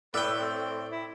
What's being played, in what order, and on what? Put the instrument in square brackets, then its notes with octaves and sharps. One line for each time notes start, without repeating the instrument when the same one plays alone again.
[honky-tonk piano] A2 E6 [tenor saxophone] B4 [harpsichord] D5 G5
[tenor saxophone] C4
E4